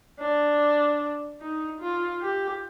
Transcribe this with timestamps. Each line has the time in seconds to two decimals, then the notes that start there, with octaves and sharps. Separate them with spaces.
0.20 D4
1.41 D#4
1.81 F4
2.22 G4